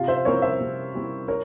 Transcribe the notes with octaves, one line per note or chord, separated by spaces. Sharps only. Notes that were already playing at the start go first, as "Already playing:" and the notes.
Already playing: C3 F4
C5 E5
G3 C4 E4 A#4 C#5
C5 E5
C3
G3 C4 E4
A#4 C#5